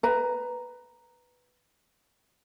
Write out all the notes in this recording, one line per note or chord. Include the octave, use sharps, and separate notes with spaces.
B4 A#5